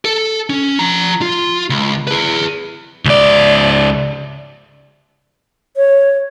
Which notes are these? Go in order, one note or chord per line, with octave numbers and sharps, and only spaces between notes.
A4
C#4
F3 A#5
F4
C#2
G#4 B4
C#2 D5
C#5